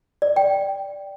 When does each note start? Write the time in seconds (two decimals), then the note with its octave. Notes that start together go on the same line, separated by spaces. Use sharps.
0.22 D5
0.36 G5